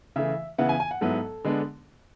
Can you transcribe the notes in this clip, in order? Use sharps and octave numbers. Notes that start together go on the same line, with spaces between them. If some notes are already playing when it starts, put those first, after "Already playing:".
C#3 E3 A3 E5
C#3 E3 B3 E4 F#5
G#5
G#5
F#5
G#2 F#3 B3 E4 A4
D3 G#3 B3 D4